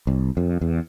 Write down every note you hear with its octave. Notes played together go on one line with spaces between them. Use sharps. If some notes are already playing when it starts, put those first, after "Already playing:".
C2
F2
E2